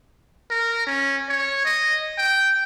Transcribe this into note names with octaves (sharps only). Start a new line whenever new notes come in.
A#4
C#4
C#5
D#5
G5